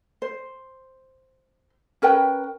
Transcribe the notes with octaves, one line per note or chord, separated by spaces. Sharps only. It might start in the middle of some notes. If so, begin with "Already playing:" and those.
C5
C#4 A#4 B4 G5